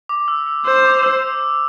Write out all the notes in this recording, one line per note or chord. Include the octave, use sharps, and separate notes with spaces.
D6
E6
E6
C5 E6
D6
E6